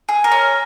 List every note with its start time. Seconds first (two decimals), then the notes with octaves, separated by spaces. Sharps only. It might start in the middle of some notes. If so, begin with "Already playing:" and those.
0.09 G#4
0.24 A#4
0.31 C#4